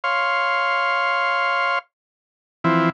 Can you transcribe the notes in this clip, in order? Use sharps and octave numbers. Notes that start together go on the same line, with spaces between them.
C#5 F5 C6
E3 F3 C4 E4